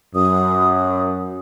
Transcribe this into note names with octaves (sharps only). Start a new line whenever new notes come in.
F#2 D#6